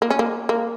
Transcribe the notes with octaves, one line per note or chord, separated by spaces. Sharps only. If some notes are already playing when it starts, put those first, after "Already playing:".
A#3
C#4
A#3
A#3